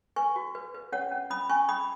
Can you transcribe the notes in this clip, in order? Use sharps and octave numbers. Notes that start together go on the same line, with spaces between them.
B4 G#5 C#6
F#4
B4
B4
C#4 C#5 F#5
C#4
C#4 B5 D#6
C#4 G#5 C#6
C#4 B5 D#6